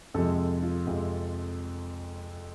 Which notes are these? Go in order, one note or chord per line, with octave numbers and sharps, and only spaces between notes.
F2 C3 F3 G#3 A4
F4
F2 C3 F3 G#3